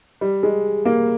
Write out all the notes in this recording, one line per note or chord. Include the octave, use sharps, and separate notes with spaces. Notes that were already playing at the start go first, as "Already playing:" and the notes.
G3
G#3
A#3